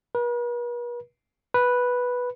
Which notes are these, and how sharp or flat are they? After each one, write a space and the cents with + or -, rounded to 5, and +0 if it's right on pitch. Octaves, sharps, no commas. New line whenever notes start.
B4 -45
B4 -5